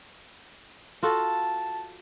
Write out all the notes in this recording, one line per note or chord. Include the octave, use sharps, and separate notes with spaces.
F4 F#4 A4 A5